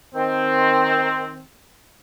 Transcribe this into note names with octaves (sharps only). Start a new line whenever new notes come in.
D#3 C4